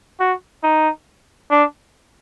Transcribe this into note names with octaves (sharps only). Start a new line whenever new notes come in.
F#4
D#4
D4